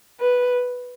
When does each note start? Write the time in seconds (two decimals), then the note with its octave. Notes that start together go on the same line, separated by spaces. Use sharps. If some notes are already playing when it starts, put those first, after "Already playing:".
0.20 B4